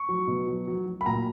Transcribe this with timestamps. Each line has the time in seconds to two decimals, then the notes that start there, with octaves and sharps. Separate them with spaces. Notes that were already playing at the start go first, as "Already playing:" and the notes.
Already playing: C#6
0.09 F#3
0.27 B2
0.48 F#3
0.67 F#3
0.86 F#3
1.01 B5
1.06 A#2 A#5